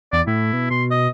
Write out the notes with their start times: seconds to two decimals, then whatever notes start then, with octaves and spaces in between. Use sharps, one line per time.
0.13 E2 D5
0.27 A2 E4
0.53 B2
0.70 B2 C6
0.91 D#5